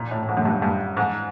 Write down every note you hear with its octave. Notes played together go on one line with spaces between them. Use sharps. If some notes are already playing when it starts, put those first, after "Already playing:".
Already playing: A#2
A2
A2
G#2
F#2
G2
G2
G#2